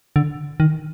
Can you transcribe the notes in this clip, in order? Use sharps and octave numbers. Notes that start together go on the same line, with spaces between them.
D3
D#3